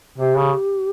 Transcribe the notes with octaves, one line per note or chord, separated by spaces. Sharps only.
C3 G4
C#3